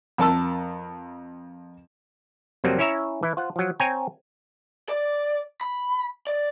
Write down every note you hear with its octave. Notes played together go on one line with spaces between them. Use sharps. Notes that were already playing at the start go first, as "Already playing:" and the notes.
F2 A#4 A5 E6
F2 C3 F#3 G3 A#3 C4
C#4 E4 C#5 E5 A#5
E3 E4
F4 C5 F#5
F3 F#3
C4 C#5 G5 G#5 A#5
D5
B5
D5